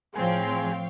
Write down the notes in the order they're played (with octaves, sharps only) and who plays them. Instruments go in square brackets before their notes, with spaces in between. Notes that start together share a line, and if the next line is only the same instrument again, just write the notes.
[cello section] A2 F3 [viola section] C4 [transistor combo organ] G#4 [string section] C#5 F5 G5